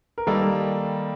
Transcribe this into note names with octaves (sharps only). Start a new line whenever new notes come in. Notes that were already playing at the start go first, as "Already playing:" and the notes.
A#4
D#3 G3 A#3 A4